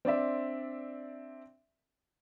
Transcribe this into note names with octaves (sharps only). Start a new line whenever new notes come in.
C4 D4 D5 E5